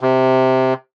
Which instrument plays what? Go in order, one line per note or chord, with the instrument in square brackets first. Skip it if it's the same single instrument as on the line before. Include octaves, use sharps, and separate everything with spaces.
[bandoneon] C3